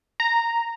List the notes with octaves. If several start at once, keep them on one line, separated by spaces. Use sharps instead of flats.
A#5